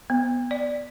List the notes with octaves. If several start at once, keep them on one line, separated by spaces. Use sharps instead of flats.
B3
D5